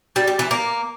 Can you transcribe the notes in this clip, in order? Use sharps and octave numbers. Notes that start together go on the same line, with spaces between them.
G3
G3
E3
A#3